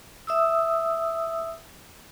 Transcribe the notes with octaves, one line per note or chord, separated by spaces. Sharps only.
E5 D#6 E6